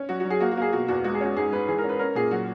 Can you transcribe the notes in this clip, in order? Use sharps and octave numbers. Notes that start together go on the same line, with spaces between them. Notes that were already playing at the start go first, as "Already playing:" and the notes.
Already playing: C#4
F#3 F#4
F#4
F#3
G#4
A#3 F#4
F#4
A#3 G#4
B2 F#4
E2 F#4
G#3 F#4
G#4
C#4 F#4
G#2 G#4
G#2 B4
E3 G#4
A#4
C#4
B4
C#4 A#4
A#2 G#4
F#3 F#4